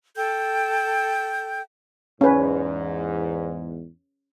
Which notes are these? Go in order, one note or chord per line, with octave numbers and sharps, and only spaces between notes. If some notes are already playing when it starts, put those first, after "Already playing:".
A4 G5 G6
E2 G#2 C#4 B4